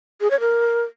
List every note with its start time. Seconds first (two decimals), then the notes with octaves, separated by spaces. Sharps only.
0.21 G#4
0.30 C#5
0.40 A#4